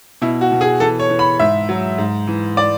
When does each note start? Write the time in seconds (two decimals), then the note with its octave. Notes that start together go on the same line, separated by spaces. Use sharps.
0.22 B2 E4
0.41 F#4
0.52 B2
0.61 G#4
0.80 E3 A4
1.00 C#5
1.10 E3
1.19 B5
1.39 G#2 E5
1.69 F#3
1.98 G#2
2.27 E3
2.57 D5